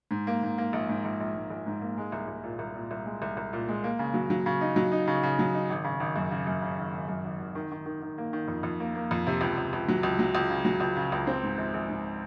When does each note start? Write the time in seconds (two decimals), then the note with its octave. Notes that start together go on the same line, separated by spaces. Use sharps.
0.11 G#2
0.27 A#3
0.43 G#2
0.58 A#3
0.73 A#1
0.89 G#2
1.05 A#1
1.20 A#1
1.36 G#2
1.50 A#1
1.67 G#2
1.81 A#3
1.98 G#3
2.12 C2
2.28 C2
2.44 A#2
2.59 C2
2.74 A#2
2.91 C2
3.06 G#3
3.22 C2
3.37 C2
3.53 A#2
3.68 G#3
3.84 A#3
3.99 C#3
4.14 F#3
4.30 F#3
4.46 C#3
4.61 D#4
4.76 F#3
4.92 D#4
5.07 C#3
5.23 C#3
5.39 F#3
5.54 D#4
5.70 G#1
5.84 C#3
6.00 G#1
6.16 F#2
6.31 C#3
6.47 F#2
6.62 C#3
6.78 G#1
6.93 G#1
7.08 F#2
7.24 G#1
7.39 G#1
7.55 D#3
7.71 D#3
7.86 D#3
8.02 D#3
8.18 A#3
8.33 D#3
8.48 F2
8.63 F2
8.80 A#3
8.95 A#3
9.11 F2
9.27 C3
9.41 C#2
9.58 C#2
9.73 C#2
9.88 F#3
10.03 C#2
10.19 F#3
10.35 C#2
10.50 C#3
10.65 F#3
10.80 C#2
10.96 C#3
11.12 C#2
11.27 C4
11.44 G#2
11.58 A#1
11.74 A#1
11.89 G#2